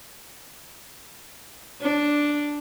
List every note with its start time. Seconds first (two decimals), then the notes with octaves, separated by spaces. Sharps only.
1.81 D4